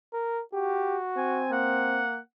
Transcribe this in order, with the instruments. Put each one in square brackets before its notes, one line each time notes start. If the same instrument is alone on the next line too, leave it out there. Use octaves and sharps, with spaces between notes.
[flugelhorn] A#4
[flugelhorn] F#4 [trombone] G4
[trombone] C4 [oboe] G#5
[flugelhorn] A#3 [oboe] F#5